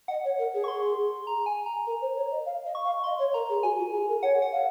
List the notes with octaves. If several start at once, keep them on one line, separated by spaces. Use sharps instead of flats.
D#5 F#5
C#5
A#4
G#4
C#6
C6
A#5
G#5
A#5
A#4
C5
C#5
D#5
F5
D#5
C#6
F5
D#5 C6
C#5
A#4 A#5
G#4
F#4 G#5
F4
G#4
A#4
C#5 F#5
F#5
F5